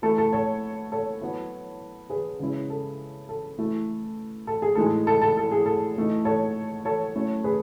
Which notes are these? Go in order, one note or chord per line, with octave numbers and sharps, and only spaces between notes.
E3 A3 E4 A4
A4
A4 C#5
A4 C#5
F#3 B3 E4
G#4 B4
C#3 G#3 C#4 E4
A4
A4
E3 A3 E4
A4
G#4
A2 E3 G#3 D#4 A4
A4
A4
A4
G#4
A4
E3 A3 D#4
A4 C#5
A4 C#5
F#3 A3 C#4 E4
G#4 B4